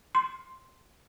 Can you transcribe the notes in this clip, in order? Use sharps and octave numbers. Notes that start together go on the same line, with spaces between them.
C6